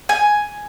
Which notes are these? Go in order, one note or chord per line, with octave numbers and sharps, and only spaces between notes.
G#5